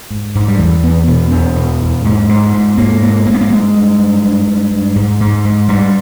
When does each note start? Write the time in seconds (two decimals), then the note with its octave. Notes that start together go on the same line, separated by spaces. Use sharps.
0.10 G#2
0.35 G#2
0.48 G3
0.59 E2 E3
0.83 E2 B3
1.07 B2 B3
1.31 E2 B3
1.56 B2
1.80 E2
2.05 G#2
2.29 G#2
2.53 G#2
2.78 G#2 A#3
3.02 G#2 A#3
3.26 G#2 A#3
3.34 B3
3.41 A#3
3.50 G2 G#3
3.75 G2
3.99 G2
4.23 G2
4.48 G2
4.71 G2
4.96 G#2
5.20 G#2
5.45 G#2
5.68 G#2 G3